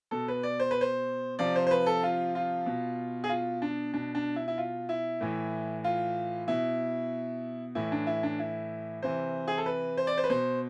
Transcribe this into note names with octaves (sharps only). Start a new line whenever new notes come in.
B2 A4
B4
D5
C5
B4
C5
C3 F3 D5
C5
C5
B4
A4
F4
F4
B2
G#4
F4
D4
B2 D4
D4
E4
E4
F4
E4
A2 E3
F4
B2 E4
A2 E3 E4
D4
E4
D4
E4
C3 E3 C5
G#4
A4
B4
C5
D5
C5
B4
B2 C5